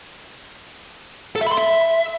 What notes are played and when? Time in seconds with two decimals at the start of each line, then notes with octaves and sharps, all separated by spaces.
1.36 A4
1.41 E5
1.46 B5
1.52 C6
1.57 E5